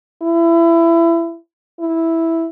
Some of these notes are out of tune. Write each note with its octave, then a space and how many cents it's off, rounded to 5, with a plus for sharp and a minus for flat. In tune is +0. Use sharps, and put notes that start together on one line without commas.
E4 +25
E4 -5